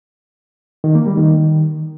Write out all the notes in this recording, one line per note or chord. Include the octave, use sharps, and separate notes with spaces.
D#3
A#3
G3
D#3